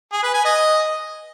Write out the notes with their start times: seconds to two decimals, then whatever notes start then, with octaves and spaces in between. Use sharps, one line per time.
0.12 G#4
0.23 B4
0.34 G#5
0.45 D#5